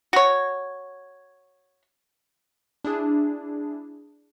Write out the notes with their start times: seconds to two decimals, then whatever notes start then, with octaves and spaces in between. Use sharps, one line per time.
0.13 F#4 C#5
2.84 D4 E4 G#4